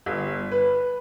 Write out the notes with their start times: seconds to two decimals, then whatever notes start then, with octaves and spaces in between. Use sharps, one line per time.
0.06 G1
0.51 B4